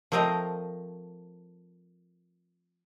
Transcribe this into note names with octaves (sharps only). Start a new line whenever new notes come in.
F3 A3 C4 A#4 D#5